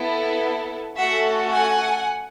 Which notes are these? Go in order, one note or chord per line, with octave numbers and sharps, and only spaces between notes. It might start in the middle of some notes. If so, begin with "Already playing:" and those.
Already playing: B3 E4 A4
A3 C#4 F#4 A4 E5 F#5
F#5 G#5